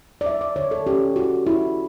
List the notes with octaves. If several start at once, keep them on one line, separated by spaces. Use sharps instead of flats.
D5
G3 E5
D5
D3 C#5
A4
C#4 G4
E4 F#4
F#3 E4